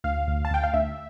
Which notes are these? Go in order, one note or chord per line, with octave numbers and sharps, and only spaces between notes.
D2 F5
D2
A5
D2 G5
F5
D2 E5